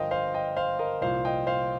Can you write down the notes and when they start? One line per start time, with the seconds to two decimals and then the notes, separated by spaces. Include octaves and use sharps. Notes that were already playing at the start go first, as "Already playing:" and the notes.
Already playing: G1 G2 F3 A#4 C5 D#5 F5 G5
0.11 C5 F5
0.34 D#5 G5
0.56 C5 F5
0.79 A#4 D#5
1.01 C2 A#2 F3 C5 F5
1.25 D#5 G5
1.47 C5 F5